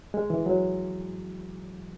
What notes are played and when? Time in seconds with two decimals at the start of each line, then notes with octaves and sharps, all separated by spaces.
0.14 G#3
0.30 E3
0.46 F#3